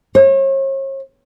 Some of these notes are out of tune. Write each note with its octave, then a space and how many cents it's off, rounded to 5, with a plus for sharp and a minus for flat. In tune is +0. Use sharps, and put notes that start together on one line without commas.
C#5 -40